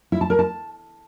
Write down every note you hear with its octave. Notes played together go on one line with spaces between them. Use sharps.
E4
A5
A#4
A5